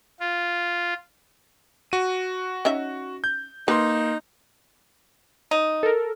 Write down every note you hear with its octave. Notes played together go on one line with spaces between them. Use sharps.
F4
F#4 D#7
C#4 D#4 E5
G6
A#3 D#4 B4 C6
D#4
A4 A#4